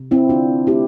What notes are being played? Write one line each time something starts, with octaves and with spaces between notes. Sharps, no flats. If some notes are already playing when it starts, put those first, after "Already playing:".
Already playing: C3
C4 E4
D3 D4 F4
A3 E4 G4